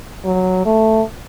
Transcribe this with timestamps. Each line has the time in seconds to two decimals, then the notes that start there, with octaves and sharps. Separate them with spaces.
0.25 F#3
0.65 A3